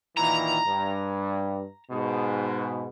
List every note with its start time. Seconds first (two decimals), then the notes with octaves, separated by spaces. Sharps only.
0.17 A#2 D#3 E3 A#5
0.66 G2
1.91 G#2 B2